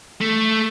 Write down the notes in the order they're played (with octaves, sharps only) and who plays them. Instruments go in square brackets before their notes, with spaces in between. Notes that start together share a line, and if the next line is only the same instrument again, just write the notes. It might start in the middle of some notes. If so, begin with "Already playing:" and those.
[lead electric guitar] A3